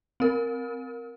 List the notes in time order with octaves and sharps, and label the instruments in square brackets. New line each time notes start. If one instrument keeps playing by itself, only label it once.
[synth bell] C4 A#4